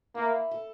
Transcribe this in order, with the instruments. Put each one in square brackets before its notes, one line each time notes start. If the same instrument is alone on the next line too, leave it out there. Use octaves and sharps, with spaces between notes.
[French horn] A#3 [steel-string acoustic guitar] E4
[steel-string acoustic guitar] A4